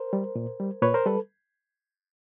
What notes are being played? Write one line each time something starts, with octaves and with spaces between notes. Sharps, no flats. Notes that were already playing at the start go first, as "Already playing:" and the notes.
Already playing: A#4 C5
G3
A#2
G3
A#2 B4 C#5
A#4 C5
G3 A4 B4